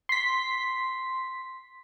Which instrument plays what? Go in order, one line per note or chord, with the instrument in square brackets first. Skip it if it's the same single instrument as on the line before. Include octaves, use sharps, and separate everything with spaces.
[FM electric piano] C6 B6